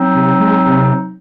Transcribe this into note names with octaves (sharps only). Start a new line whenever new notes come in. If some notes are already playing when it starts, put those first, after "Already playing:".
Already playing: F#3 C4 D#4
C3
G#3
C3